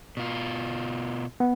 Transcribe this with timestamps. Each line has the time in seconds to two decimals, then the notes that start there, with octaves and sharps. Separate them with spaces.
0.17 B2 F4
1.40 B3